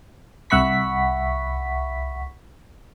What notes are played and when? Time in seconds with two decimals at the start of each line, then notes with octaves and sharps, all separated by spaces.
0.50 C2 E5 F#5 B5 C#6 B6